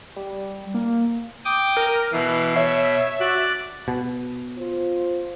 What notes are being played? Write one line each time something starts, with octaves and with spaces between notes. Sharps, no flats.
G3
A#3
G5 D6 D#6
A#4
B2 E3 C7
C#5 E5
F#4 D5 F#6
B2
F4 C5